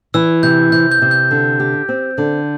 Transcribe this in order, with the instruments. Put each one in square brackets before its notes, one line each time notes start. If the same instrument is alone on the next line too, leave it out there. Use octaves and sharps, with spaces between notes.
[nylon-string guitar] E3 [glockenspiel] E6
[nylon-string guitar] C3 [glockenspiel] G6
[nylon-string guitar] C3 [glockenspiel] G6
[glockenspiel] G6
[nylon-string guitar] C3
[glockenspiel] G6
[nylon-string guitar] D3
G4
C4
D3